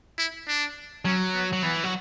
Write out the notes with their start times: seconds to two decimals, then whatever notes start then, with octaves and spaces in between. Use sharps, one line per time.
0.18 E4
0.48 D4
1.05 F#3 C#4
1.34 B3
1.53 F#3
1.63 E3 B3
1.84 F#3